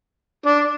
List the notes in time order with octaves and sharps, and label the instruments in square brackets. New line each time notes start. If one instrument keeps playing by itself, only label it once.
[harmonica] D4